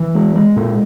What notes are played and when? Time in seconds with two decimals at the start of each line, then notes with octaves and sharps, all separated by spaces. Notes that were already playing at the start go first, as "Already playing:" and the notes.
Already playing: E3
0.15 G#3
0.36 G#3
0.56 A#2